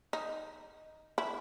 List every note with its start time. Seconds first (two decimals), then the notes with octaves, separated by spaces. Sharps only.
0.13 D#4
1.18 E4